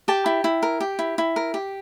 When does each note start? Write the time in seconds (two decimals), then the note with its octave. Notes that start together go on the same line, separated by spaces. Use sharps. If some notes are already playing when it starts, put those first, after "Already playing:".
0.08 G4 G5 A5
0.26 E4
0.44 E4
0.63 A#4
0.81 G4
0.99 E4
1.18 E4
1.36 A#4
1.54 G4